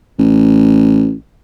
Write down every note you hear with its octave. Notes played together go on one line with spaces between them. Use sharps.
A1